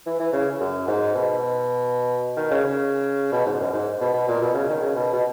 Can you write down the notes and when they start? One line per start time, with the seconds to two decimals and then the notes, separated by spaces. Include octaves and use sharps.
0.07 E3
0.20 E3
0.33 C#3
0.60 F#2
0.88 G#2
1.15 B2
2.37 D#3
2.51 C#3
2.65 C#3
3.32 B2
3.46 G#2
3.60 F#2
3.73 G#2
4.01 B2
4.14 B2
4.28 A#2
4.42 B2
4.55 C#3
4.69 D#3
4.82 C#3
4.96 B2
5.13 B2